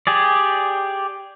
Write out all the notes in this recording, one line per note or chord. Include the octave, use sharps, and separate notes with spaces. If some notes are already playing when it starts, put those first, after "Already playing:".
G4 G#4 D5